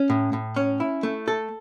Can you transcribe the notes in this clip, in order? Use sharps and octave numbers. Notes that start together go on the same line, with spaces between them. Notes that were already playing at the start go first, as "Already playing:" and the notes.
Already playing: C#4
A2
A2
C#4
E4
A3
A4